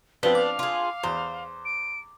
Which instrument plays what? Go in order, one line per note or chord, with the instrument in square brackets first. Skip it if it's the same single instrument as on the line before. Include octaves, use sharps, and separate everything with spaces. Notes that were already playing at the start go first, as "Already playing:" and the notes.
[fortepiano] F3 B3 C4 [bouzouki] D4 [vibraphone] B4 [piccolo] G7
[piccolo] F5 [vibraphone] D6
[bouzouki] F4 G#4
[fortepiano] E2 [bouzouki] C5
[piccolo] D7